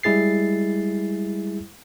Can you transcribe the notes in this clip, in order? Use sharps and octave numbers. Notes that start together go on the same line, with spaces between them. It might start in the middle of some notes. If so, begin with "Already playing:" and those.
G3 G#3 E4 G#4 A6 C7